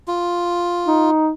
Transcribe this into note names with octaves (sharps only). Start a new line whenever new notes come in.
F4
D#4